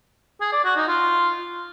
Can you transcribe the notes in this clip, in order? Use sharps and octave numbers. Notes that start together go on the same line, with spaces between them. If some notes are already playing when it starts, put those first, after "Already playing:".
G#4
D5
F#4
D#4
F4